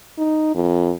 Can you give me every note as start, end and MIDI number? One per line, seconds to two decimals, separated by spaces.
0.18 0.54 63
0.55 0.93 41